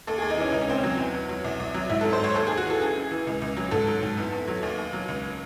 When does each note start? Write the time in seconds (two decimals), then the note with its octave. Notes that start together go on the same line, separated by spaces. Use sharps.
0.07 D#2 A4
0.18 G#4
0.22 D#2
0.30 D#4
0.37 E3 C#4
0.52 C#2 D#4
0.61 C#4
0.68 C#2 C4
0.78 C#4
0.83 F#3
0.98 E2
1.14 E2
1.29 F#3
1.44 C2
1.60 C2
1.74 F#3
1.89 G#2 E4
2.01 A4
2.05 F#3
2.13 C5
2.20 G#2 C#5
2.35 D#2 A4
2.47 G#4
2.51 D#2
2.57 F#4
2.66 E3 A4
2.81 F#2 G#4
2.96 F#2
3.11 E3
3.27 C#2
3.42 C#2
3.57 F#3
3.71 G#2 A4
3.87 F#3
4.03 G#2
4.18 E2
4.33 E2
4.48 F#3
4.63 D#2
4.78 D#2
4.93 F#3
5.08 C#2